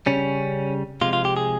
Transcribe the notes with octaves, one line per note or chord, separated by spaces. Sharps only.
C#3 G3 C#4
C3 F3 G#3 F4
F4
G4
G#4